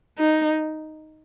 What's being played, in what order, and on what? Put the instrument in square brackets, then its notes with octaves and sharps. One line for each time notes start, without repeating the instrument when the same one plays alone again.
[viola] D#4